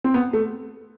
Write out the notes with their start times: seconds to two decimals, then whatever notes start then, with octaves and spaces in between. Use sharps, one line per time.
0.04 C4
0.14 B3
0.33 A3